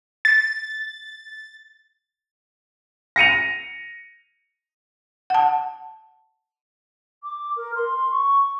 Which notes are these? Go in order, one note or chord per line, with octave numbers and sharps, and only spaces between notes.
A6
A#6 C#7 D#7 F7
F#5 A5
D6
A#4
C6
C#6